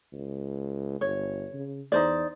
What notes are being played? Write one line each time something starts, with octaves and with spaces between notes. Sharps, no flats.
C#2
G1 C#5
C#3
E2 D#4 C5 D5